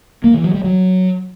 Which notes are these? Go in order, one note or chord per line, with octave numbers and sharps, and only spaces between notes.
A#3
E3
F#3
G3
F#3